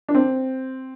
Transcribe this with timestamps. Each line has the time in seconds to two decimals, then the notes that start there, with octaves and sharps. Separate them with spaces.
0.08 D4
0.15 C4